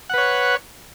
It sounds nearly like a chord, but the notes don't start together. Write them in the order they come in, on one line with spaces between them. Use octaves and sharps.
F#5 B4 C#5